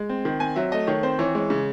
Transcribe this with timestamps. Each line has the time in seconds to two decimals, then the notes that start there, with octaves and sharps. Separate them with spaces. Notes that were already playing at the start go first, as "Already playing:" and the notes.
Already playing: G#3
0.09 C4
0.25 D#3
0.40 C4 G#5
0.56 F#3 E5
0.72 A3 D#5
0.87 D#3 C#5
1.03 C4 C5
1.19 E3 C#5
1.35 G#3 C#5
1.50 C#3